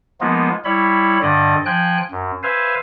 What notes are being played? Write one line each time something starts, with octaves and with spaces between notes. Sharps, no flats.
F3 G#3 A#3 B3 D#4 F4
G3 E4 C#5 B5
G2 D3 D5 D#5
F3 G5 G#5 F#6
F#2
B4 C5 E5 F5 G#5